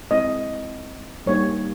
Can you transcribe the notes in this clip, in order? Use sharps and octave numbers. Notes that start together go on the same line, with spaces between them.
G#3 C4 E4 D#5
G3 A#3 D#4 G4 C#5